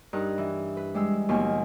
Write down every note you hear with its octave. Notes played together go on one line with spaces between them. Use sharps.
G2 D#4 A#4 A#5 F#6
E3
B4
G3 G#3 E6
D#2 B2 F3 G#5